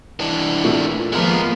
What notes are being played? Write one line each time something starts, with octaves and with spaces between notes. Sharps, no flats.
E3 D4
A#2 A3
F3 G#3 A#3 B3 A#4